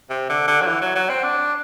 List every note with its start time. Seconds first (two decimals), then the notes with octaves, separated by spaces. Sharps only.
0.10 C3
0.30 D3
0.48 D3
0.62 F#3
0.67 E3
0.81 F#3
0.96 F#3
1.10 C4
1.23 D4